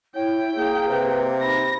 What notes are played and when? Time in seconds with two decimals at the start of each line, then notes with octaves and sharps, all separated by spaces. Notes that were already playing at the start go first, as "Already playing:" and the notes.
0.15 E4 C#5 G5
0.56 A#3 G#4
0.90 C3 B4
1.41 D#4 B5 A#6